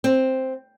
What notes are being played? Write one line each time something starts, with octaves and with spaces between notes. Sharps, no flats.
C4